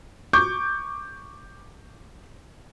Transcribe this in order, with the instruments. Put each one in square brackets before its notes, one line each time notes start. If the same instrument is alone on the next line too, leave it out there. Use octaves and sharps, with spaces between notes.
[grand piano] C#6 D6 G6